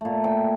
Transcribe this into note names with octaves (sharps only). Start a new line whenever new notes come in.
A#2 A3
G5